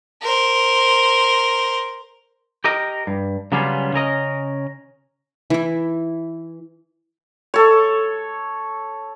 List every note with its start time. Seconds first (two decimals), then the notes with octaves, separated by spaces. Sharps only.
0.22 A#4 C5
2.64 G4 A#4 D#5
3.07 G2
3.52 C#3 F#3 G3 B3 C#4 F4
3.93 C#3 C#4 A#4 D#5
5.50 E3 E4
7.54 A4 C#5